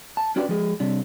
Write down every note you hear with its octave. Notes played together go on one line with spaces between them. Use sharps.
A5
C#4 D4 F#4 G4 B4 D5
F3 G#3 G#4
C3 G3 D4